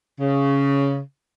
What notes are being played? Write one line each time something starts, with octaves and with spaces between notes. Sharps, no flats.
C#3